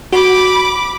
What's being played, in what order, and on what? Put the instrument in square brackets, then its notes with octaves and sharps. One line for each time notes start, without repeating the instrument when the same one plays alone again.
[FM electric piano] F#4 [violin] B5 D6